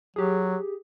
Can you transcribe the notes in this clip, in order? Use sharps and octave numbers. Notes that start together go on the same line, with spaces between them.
F#3 G4 G#4